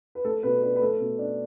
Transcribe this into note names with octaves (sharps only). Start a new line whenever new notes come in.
B4
A3 A4
B2 B4
D4 B4
B4
A3 A4
B2
D4